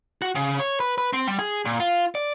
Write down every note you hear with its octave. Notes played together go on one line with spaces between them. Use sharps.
F#4
C#3
C#5
B4
B4
C4
G3
G#4
A#2
F4
D5